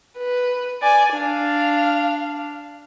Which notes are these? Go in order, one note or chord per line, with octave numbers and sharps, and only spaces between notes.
B4
D5 G#5
D4 F5